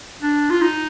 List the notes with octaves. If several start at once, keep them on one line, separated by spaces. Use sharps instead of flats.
D4
F4
D#4